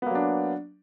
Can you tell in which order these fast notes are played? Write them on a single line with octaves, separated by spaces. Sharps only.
B3 A#3 F#3 D4